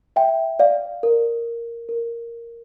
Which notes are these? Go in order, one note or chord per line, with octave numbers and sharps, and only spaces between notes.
E5 G5
D5 F5
A#4
A#4